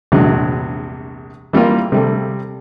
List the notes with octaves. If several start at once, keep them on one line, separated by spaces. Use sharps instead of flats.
A#1 E2 G2 C3 F#3 G#3
E3 G3 A#3 F4
C3 G3 A3